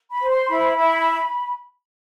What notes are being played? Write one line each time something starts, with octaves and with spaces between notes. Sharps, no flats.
B5
C5
C6
E4 B5
E4